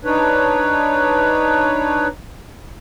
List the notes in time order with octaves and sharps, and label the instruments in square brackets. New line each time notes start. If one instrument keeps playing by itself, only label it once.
[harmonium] D4 D#4 B4 C#5